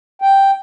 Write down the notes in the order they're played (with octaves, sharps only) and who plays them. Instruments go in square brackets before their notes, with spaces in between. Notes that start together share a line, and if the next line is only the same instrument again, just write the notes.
[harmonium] G5